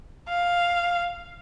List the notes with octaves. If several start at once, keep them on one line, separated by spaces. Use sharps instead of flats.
F5